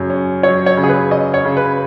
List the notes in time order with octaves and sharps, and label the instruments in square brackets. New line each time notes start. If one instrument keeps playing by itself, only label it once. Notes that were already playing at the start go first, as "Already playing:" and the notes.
Already playing: [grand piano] F#2 C#3
C#4
[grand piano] F#3 [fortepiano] C#5
[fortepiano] C#5
[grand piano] C#3
[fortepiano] G#4
B4
[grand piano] C#4 [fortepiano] D#5
[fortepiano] C#5
[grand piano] C#3
[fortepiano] B4